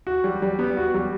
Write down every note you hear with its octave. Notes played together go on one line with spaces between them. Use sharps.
F#4
G3
G3
B3
F#4
G3